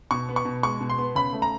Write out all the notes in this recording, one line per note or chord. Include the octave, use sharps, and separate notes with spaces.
B2 C#6
B3
C#6
B2
G#3 C#6
B2
C6
B3
C#3 B5
A3
A#5